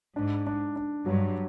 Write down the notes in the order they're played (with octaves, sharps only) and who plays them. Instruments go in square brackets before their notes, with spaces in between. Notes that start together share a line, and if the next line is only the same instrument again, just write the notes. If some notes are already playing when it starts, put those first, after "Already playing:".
[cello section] G#2 [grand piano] D4
[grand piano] D4
D4
[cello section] G2 [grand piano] F#3